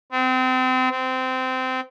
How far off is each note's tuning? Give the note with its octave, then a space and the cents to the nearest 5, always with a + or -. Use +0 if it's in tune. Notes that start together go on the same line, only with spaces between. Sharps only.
C4 -30
C4 -20